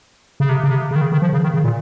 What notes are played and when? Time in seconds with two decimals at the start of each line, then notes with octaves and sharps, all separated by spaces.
0.40 C#3
0.49 C3
0.64 C#3
0.71 C3
0.91 C#3
0.96 D#3
1.01 C#3
1.12 D#3
1.22 F3
1.33 C#3
1.43 D#3
1.54 C#3
1.64 A#2